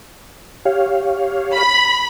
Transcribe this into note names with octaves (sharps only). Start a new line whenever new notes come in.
G4 C#5 F5
B5